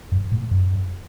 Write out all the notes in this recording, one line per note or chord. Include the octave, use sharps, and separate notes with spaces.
F#2
A2
F#2